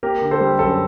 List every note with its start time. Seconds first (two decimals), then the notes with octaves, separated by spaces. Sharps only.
0.03 A#3 G4 A#4
0.22 D3
0.31 A4 C5
0.41 G3
0.59 F#2 A4